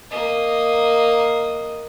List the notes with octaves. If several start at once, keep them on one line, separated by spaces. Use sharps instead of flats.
A#3 D#5